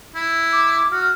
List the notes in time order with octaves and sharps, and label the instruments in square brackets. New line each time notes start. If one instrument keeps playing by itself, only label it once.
[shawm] E4
[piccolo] D6
[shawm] F#4 [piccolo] F6